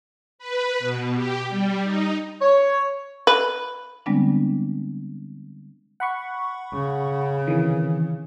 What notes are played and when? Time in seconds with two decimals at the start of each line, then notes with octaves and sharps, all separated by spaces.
0.39 B4
0.79 B2
1.15 G4
1.49 G3
1.84 D#4
2.41 C#5
3.27 B4
4.06 D3 G3 G#3 B3 C4 D4
6.00 F#5 B5 C#6
6.74 C#3
7.47 C3 D#3 E3